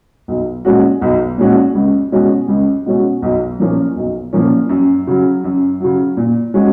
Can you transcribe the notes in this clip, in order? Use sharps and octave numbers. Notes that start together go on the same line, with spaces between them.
B1
A#2 G#3 C#4 F#4
B1
A#2 G#3 C#4 F#4
C#2
B2 G#3 C#4 F#4
C#2
B2 G#3 C#4 F#4
B1
A#2 F3 A#3 C#4
B1
A#2 F3 A#3 C#4
F#2
C#3 F#3
F#2
C#3 F#3
A#2
G#3 C#4 F#4